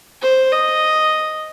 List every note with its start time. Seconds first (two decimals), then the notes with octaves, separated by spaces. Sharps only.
0.22 C5
0.53 D#5